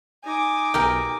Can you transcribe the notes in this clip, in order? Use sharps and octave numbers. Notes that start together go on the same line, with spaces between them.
D#4 G#5 D6
B1 G4 A#4 G5